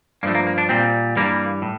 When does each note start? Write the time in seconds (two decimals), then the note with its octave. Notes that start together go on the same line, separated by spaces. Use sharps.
0.23 G2 F3 A3 A#3
0.35 A#3
0.47 A#3
0.58 D4
0.69 A#2 G3 C4
1.16 G2 E3 G3 A#3
1.62 A2